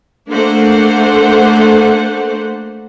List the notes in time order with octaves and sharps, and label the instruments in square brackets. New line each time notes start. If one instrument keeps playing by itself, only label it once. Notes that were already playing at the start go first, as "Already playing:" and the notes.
[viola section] A3 A#3 D4 C5 F#5